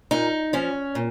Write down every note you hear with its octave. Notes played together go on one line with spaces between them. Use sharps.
A#2 D#4
F3 C#4
A#2